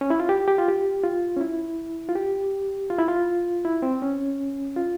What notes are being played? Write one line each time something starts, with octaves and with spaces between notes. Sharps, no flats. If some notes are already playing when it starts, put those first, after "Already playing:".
C#4
E4
F4
G4
G4
F4
G4
F4
C#4
E4
F4
G4
F4
E4
F4
E4
C4
C#4
F4